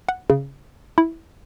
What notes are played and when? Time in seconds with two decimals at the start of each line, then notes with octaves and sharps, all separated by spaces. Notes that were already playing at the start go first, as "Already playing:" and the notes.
0.09 F#5
0.30 C#3
0.98 E4